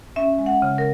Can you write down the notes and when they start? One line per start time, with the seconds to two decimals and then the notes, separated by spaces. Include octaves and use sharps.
0.16 C#4 E5
0.39 G#3
0.46 F#5
0.62 C#3
0.78 A#4